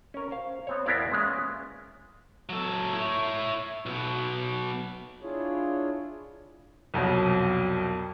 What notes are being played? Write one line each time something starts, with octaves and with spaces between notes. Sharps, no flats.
C#4 A#4
C5 F5
B3 C4 C#5
E2 B3 E4 A#4 D5 F5
G#3 A#3 B3 C#4 E5 F5
F#3 A4
E4 C#5
B1 B2
D4 E4 F4 G#4 C#5
C2 F2 B2 F#3